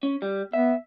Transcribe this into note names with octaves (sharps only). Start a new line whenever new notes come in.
C#4
G3
B3 E5